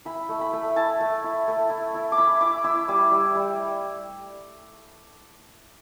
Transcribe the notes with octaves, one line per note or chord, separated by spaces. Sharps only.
E4 B5
A3
B5
A3
E4 A5
A3
E4
A3
E4
E4
D6
E4 B5
E4 D6
E4 E6
G3 D6
G3
G3